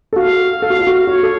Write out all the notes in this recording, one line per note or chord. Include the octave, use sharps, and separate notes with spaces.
A4
F#4 F5
A4 F5
F#4
F4
F#4
F#4 C#5
A4